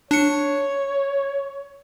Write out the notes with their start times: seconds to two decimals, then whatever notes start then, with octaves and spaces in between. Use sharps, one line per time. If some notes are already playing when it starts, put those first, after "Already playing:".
0.11 D4 C#5 C#7